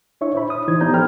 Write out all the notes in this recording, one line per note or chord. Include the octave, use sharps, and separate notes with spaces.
D4 E4 C#5 E5 C#6
C5 B5
D#6
E3 D#4 E4 C5 G#6
F3 B3 G4 D5 A#5 G6
A4 C5 G5 B5 F6